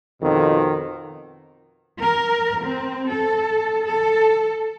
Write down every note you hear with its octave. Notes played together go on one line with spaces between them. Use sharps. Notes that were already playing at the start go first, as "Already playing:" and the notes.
F2 B2 D#3
A#4
C4
A4
A4